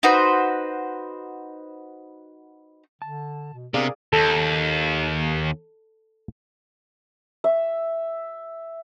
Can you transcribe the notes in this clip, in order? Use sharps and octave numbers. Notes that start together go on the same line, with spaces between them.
D#4 F#4 B4 C5
D3 A5
B2
C3 B3 D4 G#4 A#4 D5 F5
D#2 A4
E5